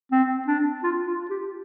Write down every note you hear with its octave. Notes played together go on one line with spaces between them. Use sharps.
C4
D4
F4
F4
G4